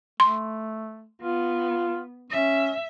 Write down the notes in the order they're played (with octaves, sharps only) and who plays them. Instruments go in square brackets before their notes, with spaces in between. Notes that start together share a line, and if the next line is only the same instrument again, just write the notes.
[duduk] A3 [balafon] C6
[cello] B3 [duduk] F4
[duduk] C#4 [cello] E5